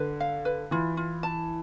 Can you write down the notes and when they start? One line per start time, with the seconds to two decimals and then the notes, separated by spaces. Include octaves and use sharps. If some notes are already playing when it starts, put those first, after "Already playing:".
Already playing: D3 B4
0.20 F5
0.45 B4
0.71 E3 F4
0.97 F4
1.23 A5